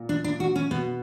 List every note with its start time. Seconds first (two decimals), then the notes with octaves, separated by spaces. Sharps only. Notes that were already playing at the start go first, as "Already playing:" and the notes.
Already playing: A#2
0.09 D4
0.24 D4
0.40 F#4
0.56 C#4
0.71 B2 B3